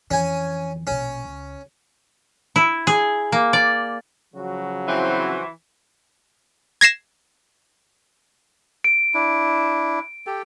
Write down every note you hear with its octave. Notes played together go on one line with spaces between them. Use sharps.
F2 E3 C#4 G#5
A#1 B2 C#4
C#2
E4
G#4
A#3
D5
C#3 F3 F#3 F#4
E3 C4 E4 F#4 C5
G#6 A#6 C7 E7
D7
D4 E4
G4 A4 G5